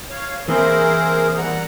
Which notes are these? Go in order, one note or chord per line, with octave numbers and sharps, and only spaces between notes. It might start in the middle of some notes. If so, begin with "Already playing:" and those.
C#5 F5
E3 A#3 C4 G#4 A#4 C5
G3 F#5 A#5